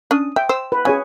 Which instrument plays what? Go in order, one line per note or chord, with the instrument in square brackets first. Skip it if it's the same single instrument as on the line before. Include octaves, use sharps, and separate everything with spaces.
[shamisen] C#4 D4 [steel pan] D#6
[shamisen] E5 [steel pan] G5
[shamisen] C5 [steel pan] E6
[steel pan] B4
[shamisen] C#3 [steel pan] G#4 C#5 G#5